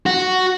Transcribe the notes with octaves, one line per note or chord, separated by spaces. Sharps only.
F#4